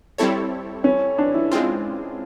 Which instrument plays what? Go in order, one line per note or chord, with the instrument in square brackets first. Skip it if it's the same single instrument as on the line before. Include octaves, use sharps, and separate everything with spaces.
[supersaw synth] G3 C4 E4 A4 C#5
[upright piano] C#4
D4
E4
[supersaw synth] G#3 C4 F4